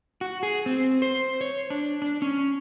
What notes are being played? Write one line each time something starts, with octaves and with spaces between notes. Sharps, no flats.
F#4
G#4
C4
C5
C#5
D4
D4
C#4